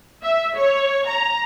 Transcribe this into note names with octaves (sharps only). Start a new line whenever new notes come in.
E5
C#5
A#5